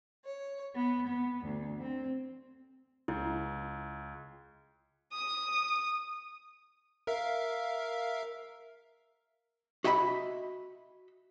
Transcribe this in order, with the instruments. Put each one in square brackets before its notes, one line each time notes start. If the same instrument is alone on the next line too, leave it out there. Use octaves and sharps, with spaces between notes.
[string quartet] C#5
B3
B3
D2
C4
[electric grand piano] C#2 [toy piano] E4
[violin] D#6
[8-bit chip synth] A#4 E5 F5
[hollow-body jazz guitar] F#4 D#5 E5 G#5 B5